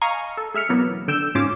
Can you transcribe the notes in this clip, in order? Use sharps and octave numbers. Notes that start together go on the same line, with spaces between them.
D#5 F5 G#5 A#5 C#6
A4
G#3 E5 F6 C#7
B2 E3 F#3 A#3 B3
D3 G5 E6 G6 E7
G#2 C#4 F4 D6